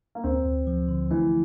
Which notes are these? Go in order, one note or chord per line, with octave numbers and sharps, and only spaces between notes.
A#3
D2 C4
D2
F3
D3
E3 A3